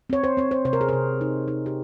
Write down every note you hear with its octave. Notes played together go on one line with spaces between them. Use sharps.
C4 C#5
C5
C4 C#5
C5
C3 C5
A#4
G#4
C3 A#4
D#4
D#4
G4